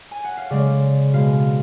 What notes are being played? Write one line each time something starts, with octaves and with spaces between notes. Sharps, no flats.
G#5
F#5
F5
C#3 G#3 D5
B2 G#3 F5